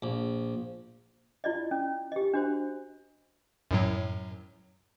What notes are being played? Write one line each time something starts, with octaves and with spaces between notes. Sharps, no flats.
A#1
E4 F4 D5 D#5
C#4
G4 D#5
D4 F#4 C5
F#2 A2 F#3